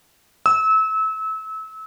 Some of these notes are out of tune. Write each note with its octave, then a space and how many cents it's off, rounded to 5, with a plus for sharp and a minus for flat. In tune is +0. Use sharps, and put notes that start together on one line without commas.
E6 -30